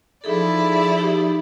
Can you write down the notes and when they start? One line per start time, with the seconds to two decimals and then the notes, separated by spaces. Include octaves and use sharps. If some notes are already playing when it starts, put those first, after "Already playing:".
0.24 F3 D#4 E4 G#4 A4 D5
0.98 D#4 G4